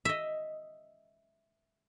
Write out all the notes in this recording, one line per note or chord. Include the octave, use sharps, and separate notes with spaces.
D#5 E5